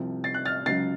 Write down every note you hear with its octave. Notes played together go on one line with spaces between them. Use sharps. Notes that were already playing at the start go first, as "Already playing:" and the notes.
Already playing: C2 C3 F3
A6 C7
F#6
F6 A6
C#2 C#3 F#3 A6 C7